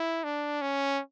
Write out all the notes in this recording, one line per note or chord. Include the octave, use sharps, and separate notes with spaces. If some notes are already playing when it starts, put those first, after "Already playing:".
Already playing: E4
D4
C#4